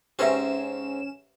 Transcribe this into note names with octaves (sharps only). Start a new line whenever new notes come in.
G#2 C4 C#4 G4 B4 E5 E7